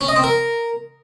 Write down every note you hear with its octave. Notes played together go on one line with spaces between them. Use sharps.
C#4
D#5
C4
A#4